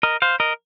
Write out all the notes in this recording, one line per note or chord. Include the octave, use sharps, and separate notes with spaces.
A#4 D#5
C5 F5
A#4 D#5